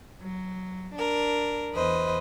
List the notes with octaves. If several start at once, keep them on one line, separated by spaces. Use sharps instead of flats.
F#3
D4 A#4
E2 B4 C5 D#5